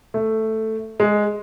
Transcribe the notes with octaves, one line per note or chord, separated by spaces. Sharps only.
A3
G#3